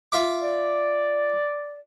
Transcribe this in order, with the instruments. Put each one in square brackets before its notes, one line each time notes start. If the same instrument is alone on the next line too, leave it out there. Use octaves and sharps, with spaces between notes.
[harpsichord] F4 E5 D6
[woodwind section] D5